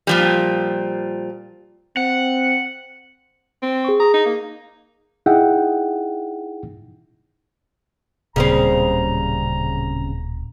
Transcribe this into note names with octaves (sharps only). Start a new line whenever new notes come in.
A#2 F3 G3
C4 F#5
C4
G#4 C#6
G#4 A#5 D#6
D#4
A#3
D#4 E4 G#4 E5 F#5 G5
D1 A#2 C#3 G3 C4 A#5